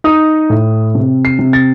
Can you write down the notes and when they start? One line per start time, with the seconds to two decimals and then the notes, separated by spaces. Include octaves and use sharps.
0.04 D#4 D#6
0.50 A2
0.95 C3
1.25 C7
1.39 C3
1.53 A6